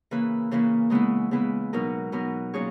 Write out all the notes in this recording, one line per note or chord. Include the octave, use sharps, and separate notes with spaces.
C#3 E3 A#3 E4 B4
C#3 E3 A#3 E4 B4
C#3 G#3 B3 E4 B4
C#3 G#3 B3 E4 B4
B2 F#3 B3 D#4 A#4
B2 F#3 B3 D#4 A#4
A#2 F#3 C#4 G#4 C#5